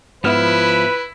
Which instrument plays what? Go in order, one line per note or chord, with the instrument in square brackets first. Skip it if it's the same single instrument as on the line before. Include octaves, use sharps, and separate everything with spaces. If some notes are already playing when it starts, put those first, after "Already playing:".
[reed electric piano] G#2 B3 E5 [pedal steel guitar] F3 F6 [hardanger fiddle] E4 [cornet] B4